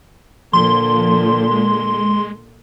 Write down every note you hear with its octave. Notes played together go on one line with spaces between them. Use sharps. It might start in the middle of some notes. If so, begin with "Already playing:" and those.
A#2 D3 F3 C6
G#3